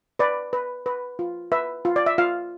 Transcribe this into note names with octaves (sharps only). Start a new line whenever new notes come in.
B4 D5
B4
B4
F4
B4 E5
F4
D5
E5
F4 F5